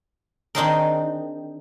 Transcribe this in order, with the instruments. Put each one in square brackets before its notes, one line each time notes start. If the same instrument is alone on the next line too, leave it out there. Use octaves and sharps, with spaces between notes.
[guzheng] D#3 C4 D4 D#4 G#4 A#4